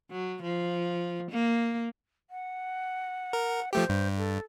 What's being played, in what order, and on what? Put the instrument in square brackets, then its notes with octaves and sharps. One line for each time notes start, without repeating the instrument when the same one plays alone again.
[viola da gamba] F#3
F3
A#3
[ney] F#5
[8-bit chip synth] A#4
[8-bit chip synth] F3 A3 G4 [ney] C5
[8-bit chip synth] G2
[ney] A4